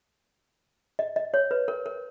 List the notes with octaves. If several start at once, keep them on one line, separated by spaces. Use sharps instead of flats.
D#5
D#5
C#5
B4
A#4
A#4